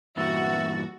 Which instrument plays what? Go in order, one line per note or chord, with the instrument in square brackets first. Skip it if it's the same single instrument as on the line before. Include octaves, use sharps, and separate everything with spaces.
[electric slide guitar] G2 A#2 E3 [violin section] F#4 [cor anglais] E5 [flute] A6